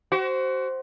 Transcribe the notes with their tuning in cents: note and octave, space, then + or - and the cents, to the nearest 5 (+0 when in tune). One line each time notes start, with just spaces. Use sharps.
F#4 +30 C5 +0